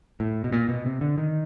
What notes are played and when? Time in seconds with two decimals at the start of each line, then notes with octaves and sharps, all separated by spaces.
0.20 A2
0.44 B2
0.52 A#2
0.69 B2
0.86 C3
1.01 D3
1.18 D#3